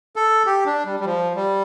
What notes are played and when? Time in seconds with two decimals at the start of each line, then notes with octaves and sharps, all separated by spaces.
0.16 A4
0.46 G4
0.66 D4
0.85 G3
1.00 G3
1.06 F3
1.35 G3